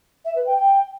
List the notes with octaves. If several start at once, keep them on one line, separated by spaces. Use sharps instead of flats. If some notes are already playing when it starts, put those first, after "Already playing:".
E5
B4
G5
G5